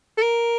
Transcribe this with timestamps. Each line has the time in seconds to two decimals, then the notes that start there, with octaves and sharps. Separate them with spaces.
0.18 A4
0.22 A#4